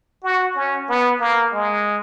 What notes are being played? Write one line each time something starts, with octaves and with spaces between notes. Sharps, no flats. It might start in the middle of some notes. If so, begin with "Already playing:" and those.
F#4
C#4
B3
A#3
G#3